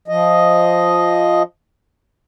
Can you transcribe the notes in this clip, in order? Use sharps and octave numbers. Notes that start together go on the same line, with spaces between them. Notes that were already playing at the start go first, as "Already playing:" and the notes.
F3 D#5